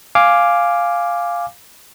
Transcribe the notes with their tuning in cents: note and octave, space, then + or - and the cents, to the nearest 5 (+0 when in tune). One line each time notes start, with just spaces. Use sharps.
F5 +0 G#5 +0 D6 +0